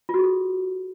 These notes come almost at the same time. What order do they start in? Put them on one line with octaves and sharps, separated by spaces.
F4 F#4 G#4 A4